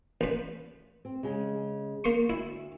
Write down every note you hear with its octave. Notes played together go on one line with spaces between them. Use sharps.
A1 B4
C4
C#3 G#3
A#3 C6 C#6
D2 E4